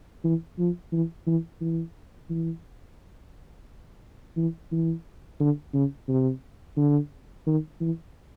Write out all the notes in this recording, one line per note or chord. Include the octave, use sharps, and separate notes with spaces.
E3
F3
E3
E3
E3
E3
E3
E3
D3
C#3
C3
D3
D#3
E3